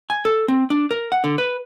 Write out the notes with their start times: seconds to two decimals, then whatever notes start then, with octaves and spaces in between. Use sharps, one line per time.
0.10 G#5
0.25 A4
0.48 C4
0.70 D4
0.91 A#4
1.12 F#5
1.24 D3
1.38 B4